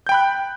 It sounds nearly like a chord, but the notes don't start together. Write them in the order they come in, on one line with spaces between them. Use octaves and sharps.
G6 G5 B5 F#6